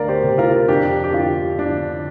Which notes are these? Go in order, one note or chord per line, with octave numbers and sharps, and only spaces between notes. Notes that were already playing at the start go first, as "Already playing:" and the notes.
Already playing: D2 A#4 D5 F5
G4 C5
C3
F4 A#4
F2 D4 G4
G4
D3 F4
D3 D4